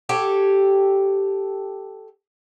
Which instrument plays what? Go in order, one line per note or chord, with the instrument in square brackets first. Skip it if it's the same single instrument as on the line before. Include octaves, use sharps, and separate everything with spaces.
[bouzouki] G4 A4 C#5